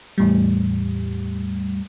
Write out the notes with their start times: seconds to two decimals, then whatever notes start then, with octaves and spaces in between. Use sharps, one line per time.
0.18 E2 A2 G3